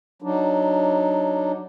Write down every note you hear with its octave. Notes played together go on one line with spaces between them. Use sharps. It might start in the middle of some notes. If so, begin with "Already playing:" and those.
F#3 D4 D#4